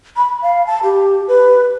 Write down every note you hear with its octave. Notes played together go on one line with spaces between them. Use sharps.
B5
F5
A5
G4
B4